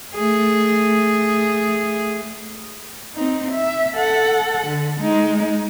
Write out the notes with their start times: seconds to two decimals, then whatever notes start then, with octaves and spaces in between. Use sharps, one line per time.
0.15 A3 G#4
3.15 C4 D#4
3.51 E5
3.95 A4 F#5
4.66 D3
5.00 G#3 D#4